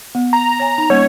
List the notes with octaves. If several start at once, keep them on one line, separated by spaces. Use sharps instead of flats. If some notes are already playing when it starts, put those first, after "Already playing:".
B3
A#5
C#5 G#5
D#4
G3 A#3 C#4 C#5